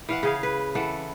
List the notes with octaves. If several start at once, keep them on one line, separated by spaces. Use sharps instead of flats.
E3 F5 F#5
C#3 G#4 F5
B4
E3 A4 F#5